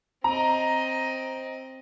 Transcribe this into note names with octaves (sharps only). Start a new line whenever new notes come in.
C4 D#5 A#5